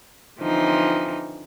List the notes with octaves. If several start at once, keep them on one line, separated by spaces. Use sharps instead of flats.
D3 E3 F3 C4 D#4